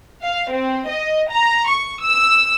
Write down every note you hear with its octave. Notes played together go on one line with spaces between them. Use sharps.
F5
C4
D#5
A#5
C#6
E6